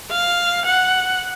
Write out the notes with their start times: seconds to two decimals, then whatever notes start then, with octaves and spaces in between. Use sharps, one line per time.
0.11 F5
0.65 F#5